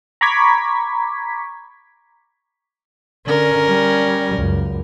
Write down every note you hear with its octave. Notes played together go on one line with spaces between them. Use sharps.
A#5 B5 C#6 D6 G#6 B6
D3 C#4 A#4
G3
C#2 F#2